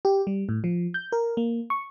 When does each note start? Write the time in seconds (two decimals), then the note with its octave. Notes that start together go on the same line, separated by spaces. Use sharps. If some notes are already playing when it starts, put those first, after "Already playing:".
0.05 G4
0.27 G3
0.49 A2
0.64 F3
0.94 G6
1.12 A#4
1.37 A#3
1.70 C#6